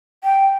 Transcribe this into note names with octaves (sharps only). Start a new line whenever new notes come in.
G5